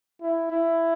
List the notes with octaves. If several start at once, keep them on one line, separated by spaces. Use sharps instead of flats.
E4
E4